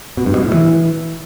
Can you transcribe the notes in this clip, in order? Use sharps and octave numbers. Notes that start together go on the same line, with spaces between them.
B2
G2
B2
A2
E3